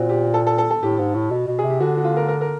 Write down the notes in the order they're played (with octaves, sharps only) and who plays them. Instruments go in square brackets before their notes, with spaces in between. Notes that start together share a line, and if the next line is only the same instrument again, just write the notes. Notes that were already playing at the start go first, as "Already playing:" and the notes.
Already playing: [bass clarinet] A#2 [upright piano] C4 F#4
[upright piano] G4
A4
A4
A4
A4
[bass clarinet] A2 [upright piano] G4
[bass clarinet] G#2
A2
B2
B2
[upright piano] G#4
[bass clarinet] C3
[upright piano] G4
[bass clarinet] D3 [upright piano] F#4
[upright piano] F#4
F4
A#4
A#4
A#4